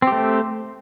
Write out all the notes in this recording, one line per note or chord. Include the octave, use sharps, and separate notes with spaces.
A3 C4 G4